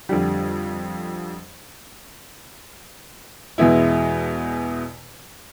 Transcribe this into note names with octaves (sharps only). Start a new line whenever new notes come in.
F2 D3 G3
E2 B2 G#3 B3 E4